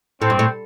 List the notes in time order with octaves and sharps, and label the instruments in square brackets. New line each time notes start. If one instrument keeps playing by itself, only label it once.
[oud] A2 [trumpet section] C4
[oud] G2
A2